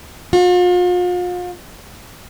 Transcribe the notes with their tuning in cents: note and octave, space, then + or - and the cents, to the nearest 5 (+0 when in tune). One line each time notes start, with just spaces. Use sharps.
F4 +40